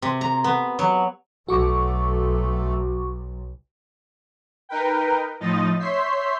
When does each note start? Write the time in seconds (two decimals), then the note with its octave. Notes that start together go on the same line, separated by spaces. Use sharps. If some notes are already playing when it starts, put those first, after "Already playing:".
0.02 C3
0.21 A#5
0.44 B3
0.79 F#3
1.48 B1 A3 F#4 A4 C#6 D6
4.69 D#4 A#4 B4 G5
5.40 A2 F3 D#4 D#5 A6
5.79 C#5 E5 C6 G6 B6 C7